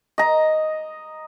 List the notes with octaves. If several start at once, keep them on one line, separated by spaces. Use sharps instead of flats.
D#5 A#5